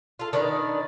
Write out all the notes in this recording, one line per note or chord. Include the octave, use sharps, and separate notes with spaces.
F4 A4
D#3 D4 B4 D5